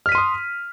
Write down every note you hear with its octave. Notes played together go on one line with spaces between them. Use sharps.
C6 D#6 F6 B6 D#7